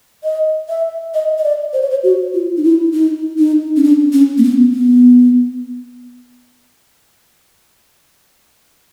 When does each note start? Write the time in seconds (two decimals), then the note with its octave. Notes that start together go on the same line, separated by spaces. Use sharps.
0.24 D#5
0.69 E5
1.14 D#5
1.38 D#5
1.44 D5
1.73 C5
1.82 C#5
1.90 C5
2.04 F#4
2.34 F4
2.57 D#4
2.63 E4
2.93 D#4
3.38 D#4
3.76 C#4
3.84 D4
4.13 C#4
4.38 A#3
4.44 B3
4.74 B3